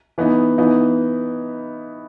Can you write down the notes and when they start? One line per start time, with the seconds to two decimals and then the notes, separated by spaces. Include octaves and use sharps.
0.18 E3 B3 D#4
0.58 E3 B3 D#4